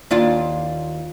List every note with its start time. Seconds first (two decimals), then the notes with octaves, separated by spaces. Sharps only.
0.11 D#2 D4 F4